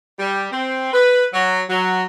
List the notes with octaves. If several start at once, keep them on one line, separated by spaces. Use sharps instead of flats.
G3
C4
B4
F#3
F#3